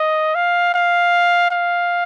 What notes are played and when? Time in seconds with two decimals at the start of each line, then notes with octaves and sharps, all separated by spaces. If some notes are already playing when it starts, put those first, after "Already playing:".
Already playing: D#5
0.35 F5
0.74 F5
1.51 F5